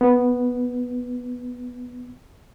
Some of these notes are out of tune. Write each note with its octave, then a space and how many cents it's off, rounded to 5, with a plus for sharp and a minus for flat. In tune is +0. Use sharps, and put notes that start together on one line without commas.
B3 -5